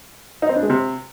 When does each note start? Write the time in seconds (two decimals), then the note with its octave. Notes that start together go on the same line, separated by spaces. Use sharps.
0.42 D#4
0.49 C4
0.56 D4
0.63 G#3
0.70 C3